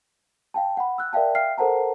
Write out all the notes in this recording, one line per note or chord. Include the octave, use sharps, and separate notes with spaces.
F5 G5 A5
F#5 B5
E6 F#6
A#4 D5 E5 F5 G5 A5
E5 F5 G5 F6 C7
A4 A#4 C5 F#5 A5 A#5